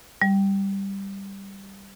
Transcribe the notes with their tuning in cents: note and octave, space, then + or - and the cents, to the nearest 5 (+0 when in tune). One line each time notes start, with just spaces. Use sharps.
G3 +5